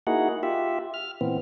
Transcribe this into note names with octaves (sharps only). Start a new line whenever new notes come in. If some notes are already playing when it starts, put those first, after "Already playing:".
A#3 D#4 E4 F#4 G#4 F#5
F4 G4 E5
F6
A#2 E3 B3 C4